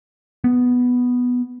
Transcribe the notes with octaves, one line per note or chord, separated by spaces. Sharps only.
B3